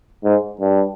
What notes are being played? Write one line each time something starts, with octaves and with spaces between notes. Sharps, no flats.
G#2
G2